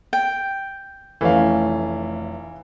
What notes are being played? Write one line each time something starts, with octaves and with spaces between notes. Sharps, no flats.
G5
F1 E3 A3 C#4 F5